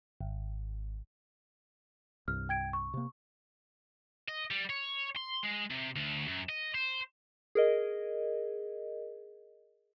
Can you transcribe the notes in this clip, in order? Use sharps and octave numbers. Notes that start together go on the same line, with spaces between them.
G#1
C2 G2 F6
G5 G#6 D7
C#6
C3 A#3
D#5
G3
C#5
C6
G#3
C3
D2
F#2
D#5
C5
G#4 A#4 D#5